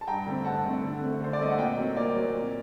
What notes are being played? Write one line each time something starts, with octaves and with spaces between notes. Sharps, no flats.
A5
G2 G5 A#5
D3 A3 C4
G2 F#5 A5
D3 A3 C4
D3
A3 C4
D3 C5
D5
A3 C4 D#5
F#5
A#2 D#5 G5
F#3 C4
A#2 A#4 D5
F#3 C4
A#2